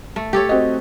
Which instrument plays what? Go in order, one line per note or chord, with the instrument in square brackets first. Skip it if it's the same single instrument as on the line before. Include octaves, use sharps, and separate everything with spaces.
[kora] A3
G4 A4 C#5
[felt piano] C4 F#4 D#5